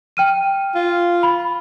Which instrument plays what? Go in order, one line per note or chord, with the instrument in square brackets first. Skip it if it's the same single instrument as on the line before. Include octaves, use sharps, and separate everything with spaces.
[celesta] G5 F6 D#7
[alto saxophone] F4
[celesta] B5